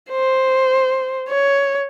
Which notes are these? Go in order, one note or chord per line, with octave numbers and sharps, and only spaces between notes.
C5
C#5